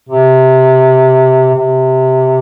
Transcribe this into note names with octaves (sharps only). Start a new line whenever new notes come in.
C3
C3